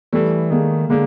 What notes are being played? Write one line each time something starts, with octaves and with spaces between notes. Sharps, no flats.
E3 G3 A3
D#3 G#3 A#3
D3 G#3 A#3